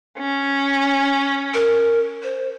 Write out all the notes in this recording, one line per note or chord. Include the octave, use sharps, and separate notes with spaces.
C#4
A#4
C5